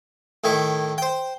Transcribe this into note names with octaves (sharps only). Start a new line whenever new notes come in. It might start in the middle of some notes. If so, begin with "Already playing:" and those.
A2 D#3 E4
C5 G5